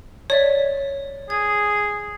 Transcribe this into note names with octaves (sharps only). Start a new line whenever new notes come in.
C#5 D5 E5
G#4 G#6